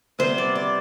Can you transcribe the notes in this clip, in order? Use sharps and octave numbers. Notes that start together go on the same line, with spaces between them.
C3 G3 B3 C5
D5
D5